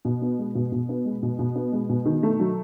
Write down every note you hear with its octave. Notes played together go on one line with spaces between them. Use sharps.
B2
B3
G#3
B2
B2
B3
G#3
B2
B2
B3
G#3
B2
D#3
A3
F#3